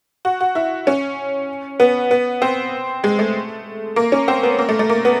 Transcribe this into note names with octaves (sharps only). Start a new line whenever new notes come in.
F#4
F#4
E4
C#4
B3
B3
C4
G#3
A3
A#3
C#4
C4
B3
A#3
A3
A3
A#3
B3